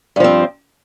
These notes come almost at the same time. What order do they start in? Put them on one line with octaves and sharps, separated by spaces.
G2 F3 C4